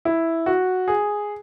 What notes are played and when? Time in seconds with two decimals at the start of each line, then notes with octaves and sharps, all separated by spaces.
0.05 E4
0.46 F#4
0.88 G#4